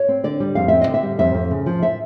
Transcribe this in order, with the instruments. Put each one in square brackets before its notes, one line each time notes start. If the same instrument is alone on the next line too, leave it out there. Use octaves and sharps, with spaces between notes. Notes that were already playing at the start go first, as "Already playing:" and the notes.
Already playing: [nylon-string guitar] C#5
C4
D3 D5
G3
F2 F5
C4 E5
D#5
D3
E5
G3
F2 E5
F2
C#3
F3
E5